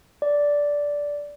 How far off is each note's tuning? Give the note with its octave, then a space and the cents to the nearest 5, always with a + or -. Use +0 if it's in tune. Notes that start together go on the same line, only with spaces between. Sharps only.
D5 -10